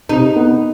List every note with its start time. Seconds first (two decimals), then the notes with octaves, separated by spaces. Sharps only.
0.09 C3 D#4
0.36 B3